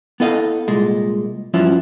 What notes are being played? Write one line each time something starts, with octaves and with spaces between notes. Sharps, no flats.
B3 E4 A4 D#5 F5
C2 A#2 G#3
G2 F3 F#3 C#4 E4